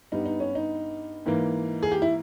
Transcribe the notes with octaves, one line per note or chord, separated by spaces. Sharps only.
G2 G3 B3 D#4
D#4
C#4
D#4
G#2 E3 A#3
G#4
G4
E4